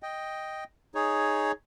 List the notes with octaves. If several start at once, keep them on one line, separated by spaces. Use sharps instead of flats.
D#5 G5
D#4 G#4 C#5